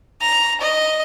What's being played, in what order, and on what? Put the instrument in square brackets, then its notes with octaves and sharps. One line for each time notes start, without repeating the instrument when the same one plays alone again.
[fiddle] A#5
D#5